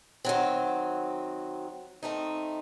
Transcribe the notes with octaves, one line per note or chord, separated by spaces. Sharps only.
D#3 F#3 C4
D#3 A3 C4 D#4